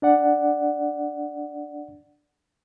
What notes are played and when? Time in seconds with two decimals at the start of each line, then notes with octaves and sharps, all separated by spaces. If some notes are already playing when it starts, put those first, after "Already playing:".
0.02 D4 D5 F#5